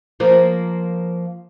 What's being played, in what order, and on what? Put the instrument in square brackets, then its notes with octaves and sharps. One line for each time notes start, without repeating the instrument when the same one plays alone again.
[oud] F3 A#3